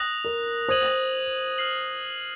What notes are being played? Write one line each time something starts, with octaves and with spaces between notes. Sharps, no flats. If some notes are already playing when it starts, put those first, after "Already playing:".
Already playing: D#6 F#6 A#6 F7
A#4
C5 D#6 G#6 D#7 F#7
F6 C7 F#7